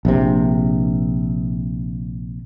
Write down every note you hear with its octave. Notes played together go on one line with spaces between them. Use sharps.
A#1 C3